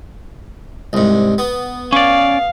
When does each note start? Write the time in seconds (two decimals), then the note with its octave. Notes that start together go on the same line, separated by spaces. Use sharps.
0.93 C2 G#2
1.38 B3
1.93 C#4 D5 F5